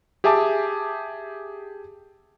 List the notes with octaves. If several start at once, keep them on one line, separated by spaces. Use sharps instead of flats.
G4 G#4 E5 G#5 A5 D6